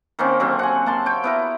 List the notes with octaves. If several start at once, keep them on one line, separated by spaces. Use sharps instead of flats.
D#3 A#3 C4 C#4
D3 F#3 C4
F#5 G#5
A#3 A5 C6
C#5 G5
B3 E4 A#4